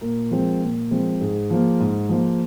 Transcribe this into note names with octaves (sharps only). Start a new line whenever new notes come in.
A#2 A#4
F3 G#3 C4
A#2
F3 G#3 C4
G#2 G#4
F3 A#3
G#2
F3 A#3